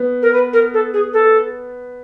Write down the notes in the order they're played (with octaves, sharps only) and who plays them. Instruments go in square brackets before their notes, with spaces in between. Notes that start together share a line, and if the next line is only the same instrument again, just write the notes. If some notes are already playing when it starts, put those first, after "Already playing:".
Already playing: [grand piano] B3
[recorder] A#4
B4
A#4
A4
G#4
A4